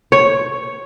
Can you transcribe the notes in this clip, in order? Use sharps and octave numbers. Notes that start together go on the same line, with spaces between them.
C#5